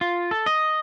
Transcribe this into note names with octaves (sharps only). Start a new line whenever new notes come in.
F4
A4
D#5